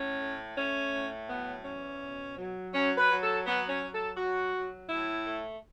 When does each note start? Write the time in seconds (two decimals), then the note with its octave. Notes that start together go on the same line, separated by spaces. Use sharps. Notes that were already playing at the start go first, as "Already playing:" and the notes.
Already playing: A2 C#4
0.20 A3
0.57 A3 C#4
0.93 A2
1.29 F#3 B3
1.65 E2 C#4
2.01 B2
2.37 F#3
2.74 F#3 C#4
2.97 B4
3.10 F#3
3.22 A4
3.46 F#3 B3
3.69 C#4
3.81 F#3
3.93 A4
4.17 F#3 F#4
4.54 F#3
4.89 A2 E4
5.27 A3